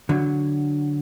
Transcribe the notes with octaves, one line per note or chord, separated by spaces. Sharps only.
D3 F#3